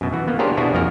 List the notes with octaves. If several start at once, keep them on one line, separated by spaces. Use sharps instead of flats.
F#2 B2
E3 F#4
A#3 B3
D4 G4 G#4 A#4 C5 C#5
B2 D4 E4 F#4 G#4
F2 F3 A#3 F#4 A#4 A#5